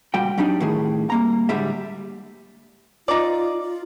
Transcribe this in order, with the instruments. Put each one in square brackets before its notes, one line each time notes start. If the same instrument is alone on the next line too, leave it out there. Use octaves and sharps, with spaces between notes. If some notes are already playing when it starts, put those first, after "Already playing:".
[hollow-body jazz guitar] C#2 A#2 G3 F#4 G5
F#3 G3 D4 D#4
A2 D#3 G#4
G3 A#3 A#5
D2 A2 G3 G#3 E5
[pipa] D#4 D5 [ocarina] F4
[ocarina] F4